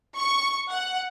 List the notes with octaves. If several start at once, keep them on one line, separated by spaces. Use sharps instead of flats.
C#6
F#5